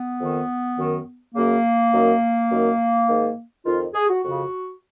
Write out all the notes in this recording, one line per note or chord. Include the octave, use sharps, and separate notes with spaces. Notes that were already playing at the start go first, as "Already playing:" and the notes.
Already playing: B3
F2 D#3
F#2 D#3
F#2 C#3 A#3
F#2 D#3
F#2 D#3
G#2 D#3
F2 D#3 F4
G#4
F#4
F2 C#3 F#4